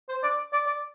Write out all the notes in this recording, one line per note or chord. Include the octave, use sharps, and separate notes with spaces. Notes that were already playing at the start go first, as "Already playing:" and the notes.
C5
D5
D5
D5